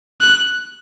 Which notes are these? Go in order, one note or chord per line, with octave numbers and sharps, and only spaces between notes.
F#6